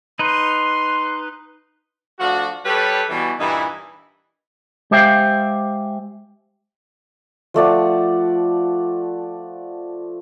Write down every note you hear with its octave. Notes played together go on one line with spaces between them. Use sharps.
D#4 B4 C6
F3 A3 D4 F#4
G3 G4 A4 B4 C#5
B2 E3 G3
G2 A#2 E3 D#4 E4
G#3 G4 C5 E5 F5 G5
F3 A3 D5 F#5